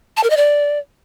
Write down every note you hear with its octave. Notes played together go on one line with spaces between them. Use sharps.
A5
A#4
D#5
D5